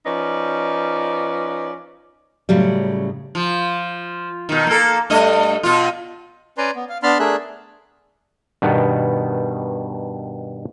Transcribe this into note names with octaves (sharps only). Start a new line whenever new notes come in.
F3 C#4 D#4 B4 D5
A2 C#3 F#3 G3
F3
B2 D#3
A#3 A4
G2 A3 D#5
B2 F4
C#4 B4 D5 G#5 A#5 C6
B3
F5
B3 D4 A5 B5 C6 F6
A3 D4 G#4 A#4 E5 F#6
G2 B2 D#3 B3